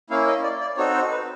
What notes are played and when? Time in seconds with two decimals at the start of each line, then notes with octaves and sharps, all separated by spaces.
0.10 A#3 C#4 E4 F5
0.27 D#5
0.43 D5
0.61 D5
0.77 C4 D#4 F#4 A4 C#5
0.95 C5
1.11 B4